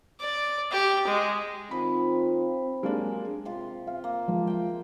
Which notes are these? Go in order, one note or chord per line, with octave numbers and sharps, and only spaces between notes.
D5
G4
G#3
D#3 C4 D#4 F4 B5
F#3 G#3 A#3 D4 G4 G#4
C3 F4
F5
A#3
F3 G#3
E5 G5